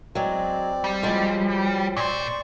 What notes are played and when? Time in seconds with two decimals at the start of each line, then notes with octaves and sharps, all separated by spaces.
0.15 F#3 G#3 C4 D5
0.84 G3
1.03 F3 F#3 G#3
1.97 A#2 C5 D5 C#6